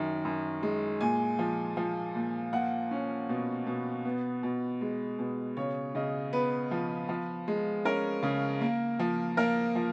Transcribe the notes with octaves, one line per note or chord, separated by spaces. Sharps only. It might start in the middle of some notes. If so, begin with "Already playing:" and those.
Already playing: F#2 D#3
F#2
G#3
A#2 G#5
F3
F3
A#2
A#3 F#5
C#4
B2
B2
B3
B2
G#3
B2
C#3 C#5
C#3 D#5
B3 B4
F3
F3
G#3
C#4 A#4
C#3
A#3
F3
A#3 A#4
F3